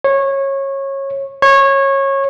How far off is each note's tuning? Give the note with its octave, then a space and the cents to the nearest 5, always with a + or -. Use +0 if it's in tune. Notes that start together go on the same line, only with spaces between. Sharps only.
C#5 -20
C#5 -20